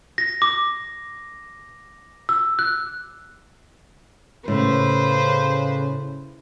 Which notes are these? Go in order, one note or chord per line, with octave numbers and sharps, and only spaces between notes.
A#6
D6
E6
F#6
A2 C#3 B4 C5